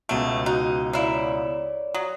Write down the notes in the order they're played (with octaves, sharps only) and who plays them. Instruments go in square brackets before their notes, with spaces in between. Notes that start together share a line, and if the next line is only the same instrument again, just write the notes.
[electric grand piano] C#2 B2 D7 [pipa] F#3 A3
[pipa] D#4 [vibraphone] F#4
[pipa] A#3 E4 [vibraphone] C#5 D5
[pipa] F#3 [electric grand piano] D#6